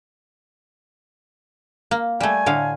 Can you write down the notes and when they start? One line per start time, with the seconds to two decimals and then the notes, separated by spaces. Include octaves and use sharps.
1.91 A#3
2.20 G3 A3 G#5
2.46 A2 D3 F5